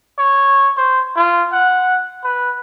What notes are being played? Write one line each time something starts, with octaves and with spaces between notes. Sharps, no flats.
C#5
C5
F4
F#5
B4